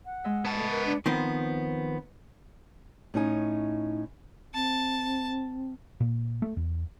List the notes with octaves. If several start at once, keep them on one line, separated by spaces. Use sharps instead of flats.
F#5
G#3 D#5 E5
B3 A5
A3
A#4
D4
D#3 F3 B3 C4
A2 C#4 D#4 G#5
C4 A5
A#2
A3
E2